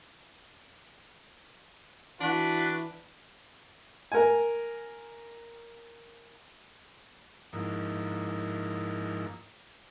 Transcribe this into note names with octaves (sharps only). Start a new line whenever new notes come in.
E3 D4 F#4 B4
A#4 G#5
G#2 F3 A#3 D#4 E4